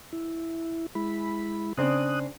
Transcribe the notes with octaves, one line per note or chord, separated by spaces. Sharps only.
E4
G#3 E4 B5
C#3 C4 D4 D#6 F#6